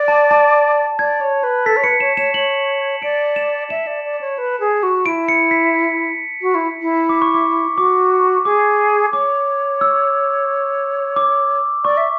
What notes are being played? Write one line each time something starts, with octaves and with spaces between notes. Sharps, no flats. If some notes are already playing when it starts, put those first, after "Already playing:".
Already playing: D5
A5
A5
D5 G#6
C#5
B4
A4 B6
C#5
B4 C#7
C#5 E7
C#5 E7
C#5 F#7
D5 D7
E7
E5 E7
D5
D5
C#5
B4
G#4
F#4
E4 D7
C#7
B6
F#4
E4
E4
D6
C#6
D6
F#4 D6
G#4 D6
C#5 D6
E6
D6
D5 C#6
E5